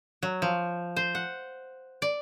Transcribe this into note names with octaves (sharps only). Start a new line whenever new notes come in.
F#3
F3
C5
F#5
D5